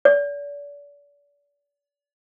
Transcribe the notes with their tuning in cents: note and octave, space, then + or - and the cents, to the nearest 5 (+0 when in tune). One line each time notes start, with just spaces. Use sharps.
D5 -35